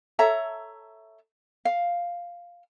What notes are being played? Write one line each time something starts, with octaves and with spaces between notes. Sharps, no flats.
A4 C#5 E5 A#5
F5